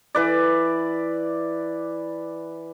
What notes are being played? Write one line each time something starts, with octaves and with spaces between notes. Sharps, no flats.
E3 B4 D5